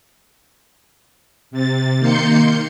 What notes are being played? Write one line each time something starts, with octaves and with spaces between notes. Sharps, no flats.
C3 A6
D#3 A#3 C6 G6 C#7